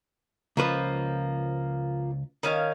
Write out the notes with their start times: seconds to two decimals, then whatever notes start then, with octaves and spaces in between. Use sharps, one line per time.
0.57 C#2 F3 A#3 B4
2.43 D#3 C#4 F5